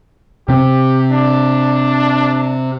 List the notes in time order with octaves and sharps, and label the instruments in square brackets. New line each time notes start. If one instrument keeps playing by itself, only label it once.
[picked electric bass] C3 C4 [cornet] G4
[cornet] D4